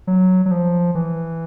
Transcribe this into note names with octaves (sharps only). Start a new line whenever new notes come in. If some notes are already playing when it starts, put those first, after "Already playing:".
F#3
F#3
F3
E3